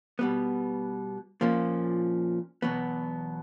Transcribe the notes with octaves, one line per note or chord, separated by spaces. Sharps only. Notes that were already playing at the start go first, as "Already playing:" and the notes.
B2 G3 B3
A#2 F3 A#3 C#4
E2 B2 F#3 B3